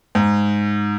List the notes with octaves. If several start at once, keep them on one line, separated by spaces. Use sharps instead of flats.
G#2